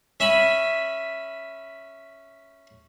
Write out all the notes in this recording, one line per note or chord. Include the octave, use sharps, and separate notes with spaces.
C#4 E5 G#5 B5